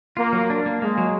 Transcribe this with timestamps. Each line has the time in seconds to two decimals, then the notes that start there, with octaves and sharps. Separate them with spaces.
0.17 A#3 F4
0.33 F#3
0.50 D4
0.66 A#3
0.82 G#3 A#3
0.98 F#3